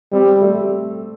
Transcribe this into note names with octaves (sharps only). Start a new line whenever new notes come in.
G3 C4
A3